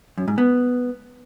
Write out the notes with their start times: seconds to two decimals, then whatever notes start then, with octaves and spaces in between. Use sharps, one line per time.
0.18 F#2
0.28 G#2
0.38 B3